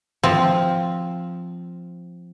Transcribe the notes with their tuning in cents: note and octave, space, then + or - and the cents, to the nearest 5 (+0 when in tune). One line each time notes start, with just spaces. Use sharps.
F3 +0 C4 +0